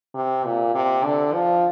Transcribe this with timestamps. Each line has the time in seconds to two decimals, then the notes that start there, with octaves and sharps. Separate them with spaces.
0.15 C3
0.44 A#2
0.75 C3
1.04 D3
1.34 F3